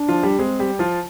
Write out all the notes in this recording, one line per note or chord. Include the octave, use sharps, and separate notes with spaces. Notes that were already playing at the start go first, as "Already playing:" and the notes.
Already playing: D4
F3 F4
G3 G4
G#3 C4 G#4
G3 G4
F3 F4